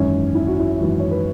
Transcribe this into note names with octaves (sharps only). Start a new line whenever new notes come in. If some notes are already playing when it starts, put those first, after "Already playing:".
Already playing: G#1 F#2 E3 C#4
E4
F#4
E4
G#1 F#2 E3 F#4
C#5
B4